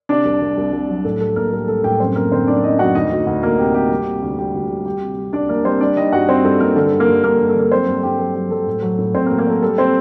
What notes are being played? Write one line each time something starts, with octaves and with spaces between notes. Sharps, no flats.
C3 D4 D5
C2
C2
C2
C2
F#3
A2 A4
G3 A4
A2 A#3 A#4
G3 A4
G3 A4
A2 G4 G5
F#2 C4 C5
F#2 A#3 A#4
D3 C4 C5
F#2 D4 D5
F#2 D#4 D#5
F#2 F#4 F#5
D2 D#4 D#5
D2
D2
D2 A#3 A#4
C3 G4
C3 G4
G3
C3
D2
G3 G4
D2
G3
G3 G4
C3
G3
C2 D4 D5
C2 A#3 A#4
G3 C4 C5
G3 D4 D5
G3 D#4 D#5
G2 F#4 F#5
G3 C4 C5
G2 A4
G2 A#3 A#4
D3 A4
G2
A#3 A#4
G2
G2 A#3 A#4
A4
G2
A4
D3 A#3 A#4
F#3 C4 C5
G2 A4
G2 G4
F#3 A4
F#3 G4
F#3 A4
A2
F#3
A2
A2 C4 C5
A#3 A#4
F#3
A#3 A#4
F#3 A4
G3 A4
C4 C5